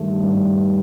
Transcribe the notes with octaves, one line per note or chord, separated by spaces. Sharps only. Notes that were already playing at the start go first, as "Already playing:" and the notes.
Already playing: G2 D#3 A3
G2